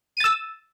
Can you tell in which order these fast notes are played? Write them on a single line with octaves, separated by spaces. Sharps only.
D#7 A6 E6